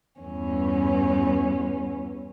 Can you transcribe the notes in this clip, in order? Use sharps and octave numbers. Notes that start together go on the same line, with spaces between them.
E2 G2 C#4